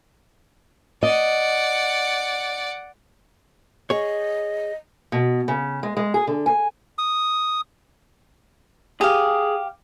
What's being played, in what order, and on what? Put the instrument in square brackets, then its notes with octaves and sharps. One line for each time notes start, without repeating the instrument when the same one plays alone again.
[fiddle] D5 F#5 [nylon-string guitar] D#5
[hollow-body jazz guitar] G#4 C#5 [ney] D#5
[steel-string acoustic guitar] B2
C#3
G#3
G#3
G#4
D3
G#5
[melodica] D#6
[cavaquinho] G4 F5 [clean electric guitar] G#4